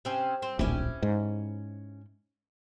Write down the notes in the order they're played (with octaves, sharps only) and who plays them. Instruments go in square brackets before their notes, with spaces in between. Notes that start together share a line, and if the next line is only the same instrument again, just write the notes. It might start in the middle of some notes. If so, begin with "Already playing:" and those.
[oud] C3 C4 C#4
C4
[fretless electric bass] D1 A#1 [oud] C#4 E4 G4
[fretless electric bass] G#2